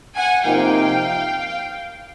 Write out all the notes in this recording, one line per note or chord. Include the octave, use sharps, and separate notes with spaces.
F#5 G#5
C3 F3 A#3 D#4 F5 G5